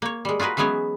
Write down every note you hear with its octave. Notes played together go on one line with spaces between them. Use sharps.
A#3 C#5
G3 G#3
F4 F#4 G#4 A#4 B4
E3 F#3 G#3 B3 C#4 C#5